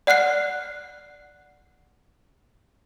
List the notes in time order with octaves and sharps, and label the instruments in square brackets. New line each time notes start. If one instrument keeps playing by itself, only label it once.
[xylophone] D5 F#5 F6 F#6 C7